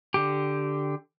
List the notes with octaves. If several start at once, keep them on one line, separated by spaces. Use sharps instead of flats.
D3 G4